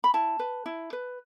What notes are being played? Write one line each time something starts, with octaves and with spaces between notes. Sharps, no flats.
B5
E4 A5
B4
E4
B4